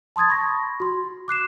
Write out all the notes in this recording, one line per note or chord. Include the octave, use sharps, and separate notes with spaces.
A5 C6 D#6 G#6 A6
B5 C#6 A#6
F#4 C6
D6 F#6 C7 E7